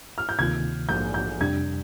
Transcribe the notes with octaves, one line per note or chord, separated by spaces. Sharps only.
F6
G6
D2 C3 D#3 A#3 F4 G#6
A#1 G#2 F3 A#3 D4 G6
G6
F2 C3 G3 D4 G4 G#6